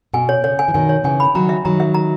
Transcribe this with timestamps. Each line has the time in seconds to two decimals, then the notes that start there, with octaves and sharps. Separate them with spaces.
0.13 B2 G#5
0.29 C#5
0.44 C#3 C#5
0.59 G#5
0.68 E3
0.74 B2 D#3 G#5
0.89 C#5
1.04 C#3 E3 G#5
1.20 B5
1.35 D#3 F#3 A#5
1.49 E5
1.65 D#3 F#3 A#5
1.80 E5
1.94 A#5